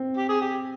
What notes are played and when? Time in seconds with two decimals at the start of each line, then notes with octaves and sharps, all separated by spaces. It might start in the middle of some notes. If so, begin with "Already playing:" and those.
Already playing: C4
0.17 G4
0.29 G#4
0.41 G4